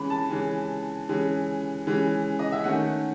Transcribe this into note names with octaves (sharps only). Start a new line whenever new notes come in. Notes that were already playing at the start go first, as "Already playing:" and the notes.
Already playing: E3 G#3 C#4 B5
A5
E3 G#3 C#4
E3 G#3 C#4
E3 G#3 C#4
D#5
E5
D#3 A3 C#4 F#5